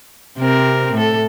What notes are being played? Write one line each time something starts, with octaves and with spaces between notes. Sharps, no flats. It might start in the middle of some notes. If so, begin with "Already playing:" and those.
C3 C4 A#4
A2 A4